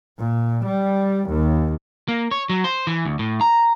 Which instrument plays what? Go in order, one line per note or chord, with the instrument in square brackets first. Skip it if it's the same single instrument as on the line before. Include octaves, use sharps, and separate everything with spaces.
[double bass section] A#2
G3
D#2
[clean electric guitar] A#3
C#5
F#3
C5
E3
D2
A2
A#5